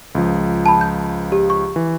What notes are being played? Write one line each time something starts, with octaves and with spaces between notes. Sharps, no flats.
C#2 F3
A5 B5
G6
G4
C#6
E3